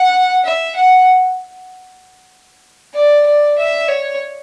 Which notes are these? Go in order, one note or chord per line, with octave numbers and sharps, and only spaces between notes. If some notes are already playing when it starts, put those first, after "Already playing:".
Already playing: F#5
E5
F#5
D5
D5
E5
C#5